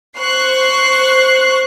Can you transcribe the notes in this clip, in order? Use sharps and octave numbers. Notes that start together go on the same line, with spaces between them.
C5 C#6 F#6 C7